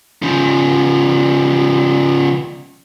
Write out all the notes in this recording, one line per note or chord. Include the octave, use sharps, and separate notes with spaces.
C#3 F3